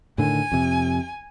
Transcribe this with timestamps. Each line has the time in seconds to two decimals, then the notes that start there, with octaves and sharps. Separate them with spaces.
0.18 A2 D3 D#3 G#5
0.52 F2 C3